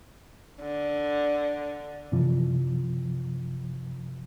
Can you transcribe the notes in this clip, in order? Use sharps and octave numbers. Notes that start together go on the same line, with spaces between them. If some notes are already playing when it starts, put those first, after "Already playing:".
D3
F#2 C3 E3 F3